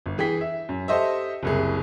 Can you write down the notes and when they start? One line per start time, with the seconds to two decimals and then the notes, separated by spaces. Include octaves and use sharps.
0.06 G1
0.18 E3 G#4 G5 B6
0.41 E5
0.69 F#2
0.88 G4 A4 C5 D#5 E5
1.43 F#1 C2 G#4